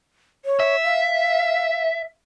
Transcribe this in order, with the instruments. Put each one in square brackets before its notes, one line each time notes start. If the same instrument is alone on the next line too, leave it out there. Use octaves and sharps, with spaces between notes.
[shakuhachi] C#5
[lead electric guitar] E5
[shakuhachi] F5